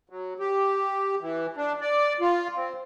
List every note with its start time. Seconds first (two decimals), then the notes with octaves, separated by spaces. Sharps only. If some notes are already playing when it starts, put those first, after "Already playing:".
0.10 F#3
0.39 G4
1.20 E3
1.57 D4
1.81 D5
2.20 F4
2.56 C4